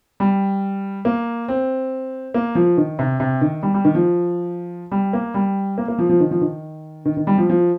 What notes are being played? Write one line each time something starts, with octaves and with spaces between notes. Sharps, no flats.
G3
A#3
C4
A#3
F3
D#3
C3
C3
D#3
G3
G3
D#3
F3
G3
A#3
G3
A#3
A#3
F3
F3
D#3
F3
D#3
D#3
D#3
G3
F3
F3